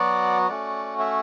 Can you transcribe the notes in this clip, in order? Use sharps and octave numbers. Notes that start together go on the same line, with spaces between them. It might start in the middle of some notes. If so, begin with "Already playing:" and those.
Already playing: F#3 B3 F#4 D5 F#5
A3 C#4 F#4 D5 F#5
C#5 E5